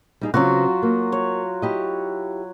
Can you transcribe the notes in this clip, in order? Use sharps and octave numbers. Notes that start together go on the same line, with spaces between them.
G3 D#4 G#4
C#3 F#3 B3 C4 F4 F#4
A#3
C#5
E4 G4 D#5